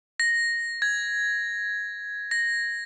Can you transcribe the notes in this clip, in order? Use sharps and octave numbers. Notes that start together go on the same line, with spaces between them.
A#6
G#6
A#6